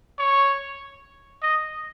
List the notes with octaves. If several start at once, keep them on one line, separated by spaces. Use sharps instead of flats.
C#5
D#5